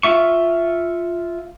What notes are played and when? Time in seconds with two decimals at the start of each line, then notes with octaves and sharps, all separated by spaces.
0.03 F4 E5 C#6